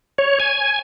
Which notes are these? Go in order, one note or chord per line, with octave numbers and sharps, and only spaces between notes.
C#5
G#5